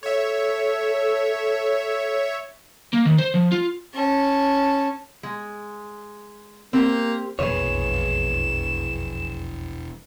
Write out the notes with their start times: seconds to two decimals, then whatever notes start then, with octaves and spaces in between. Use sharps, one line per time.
0.03 A4 C#5 E5
2.93 A#3
3.05 D#3
3.18 C5
3.34 F3
3.52 F4
3.94 C#4 A5
5.23 G#3
6.73 A#3 C4 G4 C5
7.39 E1 A#1 F2 G#4 B4 C#5 E7